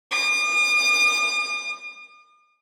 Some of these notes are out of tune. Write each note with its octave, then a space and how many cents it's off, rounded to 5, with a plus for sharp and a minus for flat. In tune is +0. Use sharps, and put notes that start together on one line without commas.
D#6 -45